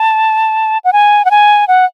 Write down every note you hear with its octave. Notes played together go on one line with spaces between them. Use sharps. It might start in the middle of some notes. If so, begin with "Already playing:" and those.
Already playing: A5
F#5
G#5
F#5
G#5
F#5